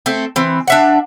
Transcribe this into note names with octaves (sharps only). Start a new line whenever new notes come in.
A3 C4
E3 C4
D4 E5 F#5